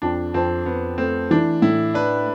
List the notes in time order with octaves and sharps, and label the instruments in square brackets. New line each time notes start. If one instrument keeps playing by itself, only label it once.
[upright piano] F2 [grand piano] D4
[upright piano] F2 [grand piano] C4
[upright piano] F2 [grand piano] B3
[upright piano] A3 [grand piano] C4
[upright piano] E3 [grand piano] D4
[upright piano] A2 [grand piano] E4
[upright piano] D4 [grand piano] B4